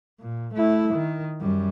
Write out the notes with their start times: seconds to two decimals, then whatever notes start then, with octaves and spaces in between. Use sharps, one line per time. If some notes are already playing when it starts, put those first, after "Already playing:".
0.20 A#2
0.54 A3 E4
0.94 D#3
1.41 F#2 G3